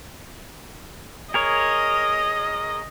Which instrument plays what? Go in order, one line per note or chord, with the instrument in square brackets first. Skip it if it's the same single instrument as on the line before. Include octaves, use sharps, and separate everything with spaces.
[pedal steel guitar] G#4 A#4 C#5 [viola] D#5